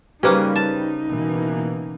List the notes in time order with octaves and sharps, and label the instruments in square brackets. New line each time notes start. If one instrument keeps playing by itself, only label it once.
[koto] C#3 A#3 C#4 [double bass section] G3 [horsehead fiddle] D#4 [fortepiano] G4 B4 C5
[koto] A5
[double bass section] B2 E3 A#3